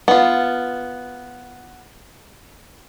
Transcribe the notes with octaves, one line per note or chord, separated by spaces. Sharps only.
B3 F4